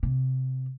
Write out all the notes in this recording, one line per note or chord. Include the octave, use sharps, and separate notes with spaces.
C3